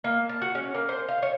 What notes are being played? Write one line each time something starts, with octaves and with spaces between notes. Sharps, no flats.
A#3
A5
F#4
C#4
A#3
C5
F5
C#5